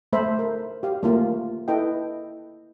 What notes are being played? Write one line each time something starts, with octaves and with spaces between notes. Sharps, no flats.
A3 A4 C5 E5 B5
A#4
G4 F5
A3 A#3 F4
E4 A4 B4 D#5 G5